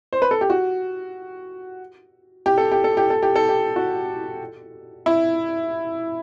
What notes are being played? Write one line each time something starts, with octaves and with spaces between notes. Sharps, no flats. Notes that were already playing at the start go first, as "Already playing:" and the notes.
C5
B4
A4
G4
F#4
G4
A4
G4
A4
G4
A4
G4
A4
G4
F#4
E4